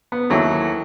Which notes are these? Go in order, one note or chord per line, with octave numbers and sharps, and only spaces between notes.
B3
D#2 E3 F#3 E4 A4